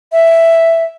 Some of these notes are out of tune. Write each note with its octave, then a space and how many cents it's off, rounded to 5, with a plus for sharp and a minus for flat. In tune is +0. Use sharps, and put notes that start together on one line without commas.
E5 +5